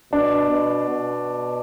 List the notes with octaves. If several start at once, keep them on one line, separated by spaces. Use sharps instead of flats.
B2 D4
B2
B2